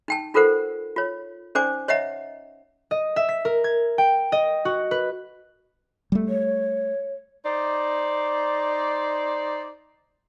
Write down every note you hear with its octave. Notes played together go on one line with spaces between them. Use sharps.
D#4 G5 A5
D#4 F4 A4 A#4 C5 F#5
F4 C#5
C#4 D#4 C5 D5 G#5 D6
C#5 D#5 E5 F#5 A#5
D#5
E5
B6
A#4
G#6
G5
D#5
F#4
B4
G3 A3
C#5
D#4 C5 D5